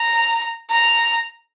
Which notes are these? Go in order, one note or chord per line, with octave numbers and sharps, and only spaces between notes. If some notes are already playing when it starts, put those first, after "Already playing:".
Already playing: A#5
A#5